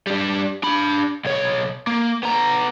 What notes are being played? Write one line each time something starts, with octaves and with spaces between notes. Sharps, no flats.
G3 D4
D4 B5
B1 C#5
A#3
B3 A#5